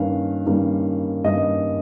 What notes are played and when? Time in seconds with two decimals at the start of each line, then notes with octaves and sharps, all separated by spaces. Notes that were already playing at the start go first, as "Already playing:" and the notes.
Already playing: G2 D#3 G3 A#3 C#4 F5
0.46 G2 D#3 G3 A#3 C#4
1.24 G2 D#3 G3 A#3 C#4 D#5